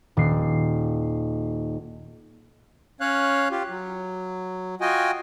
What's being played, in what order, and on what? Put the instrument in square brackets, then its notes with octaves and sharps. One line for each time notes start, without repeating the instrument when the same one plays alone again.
[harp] D#1 C7
[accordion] C#4 C#5 F5 F#6
F4 G4
F#3
F4 F#4 D#5 G5 G#5